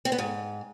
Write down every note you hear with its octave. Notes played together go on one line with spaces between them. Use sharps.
C4
B3
G#2